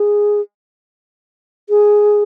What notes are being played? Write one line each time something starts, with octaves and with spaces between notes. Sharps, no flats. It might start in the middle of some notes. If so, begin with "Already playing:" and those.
Already playing: G#4
G#4